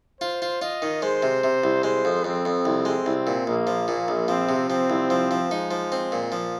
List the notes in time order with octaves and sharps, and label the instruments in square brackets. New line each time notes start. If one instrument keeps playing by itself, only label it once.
[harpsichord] F4 [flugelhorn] C5
[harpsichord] F4
[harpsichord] F4 [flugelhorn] D#5
[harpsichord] D#3
[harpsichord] G#3 [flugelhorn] C5
[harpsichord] C3
C3
C2
[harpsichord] G#3 [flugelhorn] C5
[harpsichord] F2
[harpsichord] F2 [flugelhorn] C4
[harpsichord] F2
C2
G#3
C2
A#2
[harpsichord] A#1 [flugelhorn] A#3
[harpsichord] F3
[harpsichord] A#2 [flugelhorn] A#3
[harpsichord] A#1
[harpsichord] F3 [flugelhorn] C4
[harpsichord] C3
[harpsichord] F3 [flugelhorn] C4
[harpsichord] C2
F3
F3
[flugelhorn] G#3 [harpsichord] D#4
[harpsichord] F3
C4
A#2
F3